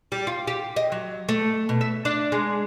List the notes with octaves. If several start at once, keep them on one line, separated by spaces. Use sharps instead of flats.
G3
F4
G4
D#5
F#3
A3
B2
E5
D4
G#3